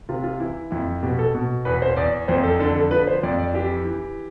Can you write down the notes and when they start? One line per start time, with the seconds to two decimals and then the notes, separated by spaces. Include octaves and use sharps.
0.09 C3 F4
0.24 F4
0.40 E3 E4
0.71 F2 E4
1.03 B2 G4
1.19 A4
1.34 B2
1.65 E2 B4
1.82 C5
1.97 E2 D5
2.28 F2 C5
2.44 A4
2.59 D3 A4
2.75 A4
2.91 F3 B4
3.07 C5
3.23 F2 D5
3.39 D5
3.54 E3 G4
3.85 E3